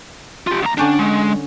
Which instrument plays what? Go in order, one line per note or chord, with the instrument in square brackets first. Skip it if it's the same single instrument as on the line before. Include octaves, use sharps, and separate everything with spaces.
[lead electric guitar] F4 G4
D2 A#5
[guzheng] D3 C#4 G5 [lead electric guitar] D4
[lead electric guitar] G#3